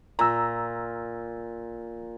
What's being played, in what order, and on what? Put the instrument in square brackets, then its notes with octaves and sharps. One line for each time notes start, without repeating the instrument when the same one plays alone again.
[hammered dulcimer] A#2 [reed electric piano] A#5 E6